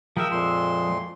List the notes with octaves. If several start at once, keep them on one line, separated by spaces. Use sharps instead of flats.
F3 G#3 A#4 E5 G5
F2 A#2 C6